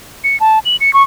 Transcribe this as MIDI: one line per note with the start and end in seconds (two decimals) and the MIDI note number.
0.24 0.39 97
0.40 0.59 81
0.65 0.76 102
0.81 0.93 97
0.93 1.03 85